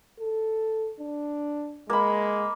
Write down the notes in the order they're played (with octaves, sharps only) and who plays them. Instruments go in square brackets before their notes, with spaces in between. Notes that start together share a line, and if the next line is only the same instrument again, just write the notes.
[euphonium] A4
D4
[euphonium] G#3 [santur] A#3 B5